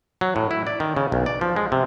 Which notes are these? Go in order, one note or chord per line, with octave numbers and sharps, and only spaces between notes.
F#3
A2
E4
D5
D#3
C#3
B1
D5
F3
G#3
C3